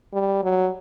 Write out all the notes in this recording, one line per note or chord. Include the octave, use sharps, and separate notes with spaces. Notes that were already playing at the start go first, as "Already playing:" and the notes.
G3
F#3